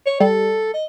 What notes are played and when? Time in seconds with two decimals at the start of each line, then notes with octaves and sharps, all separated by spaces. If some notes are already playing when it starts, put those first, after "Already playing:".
0.06 C#5
0.20 G3 A4
0.74 D#5